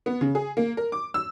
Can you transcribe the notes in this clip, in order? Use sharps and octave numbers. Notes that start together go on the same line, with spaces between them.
B3
C#3
G#4
A#3
A#4
D6
E6